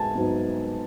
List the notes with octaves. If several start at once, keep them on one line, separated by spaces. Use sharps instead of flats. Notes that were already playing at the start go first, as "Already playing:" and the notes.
Already playing: G#2 B3 D#4 G#5 A5
G#2 F#3 B3 D#4